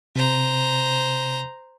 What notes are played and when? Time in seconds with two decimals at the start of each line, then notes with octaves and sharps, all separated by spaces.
0.16 C3 C5 A#5